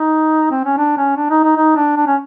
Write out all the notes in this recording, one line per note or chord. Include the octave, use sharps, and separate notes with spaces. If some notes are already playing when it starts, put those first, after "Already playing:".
Already playing: D#4
C4
C#4
D4
C#4
D4
D#4
D#4
D#4
D4
D4
C#4